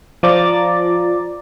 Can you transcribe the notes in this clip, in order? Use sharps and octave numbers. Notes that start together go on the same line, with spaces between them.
F3 D5 A#5 D6 A6